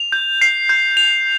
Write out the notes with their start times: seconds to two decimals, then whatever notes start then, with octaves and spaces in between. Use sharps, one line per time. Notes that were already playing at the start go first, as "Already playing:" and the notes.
Already playing: F7
0.12 G6
0.41 C7
0.69 G6
0.97 F7